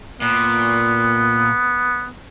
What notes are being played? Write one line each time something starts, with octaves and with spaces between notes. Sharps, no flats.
A#2 B3